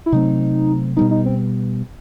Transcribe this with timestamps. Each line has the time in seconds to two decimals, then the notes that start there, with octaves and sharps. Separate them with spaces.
0.06 E4
0.12 C3 F#3 A3 C4 D#4
0.96 B2 G3 B3 D#4
1.11 D#4
1.26 C4